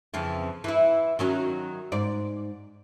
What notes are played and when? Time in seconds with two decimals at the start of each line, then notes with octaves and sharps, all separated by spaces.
0.14 F2 C#3 E3
0.64 E3 E4
1.19 D#3 F#3 C#4
1.92 G#2 D5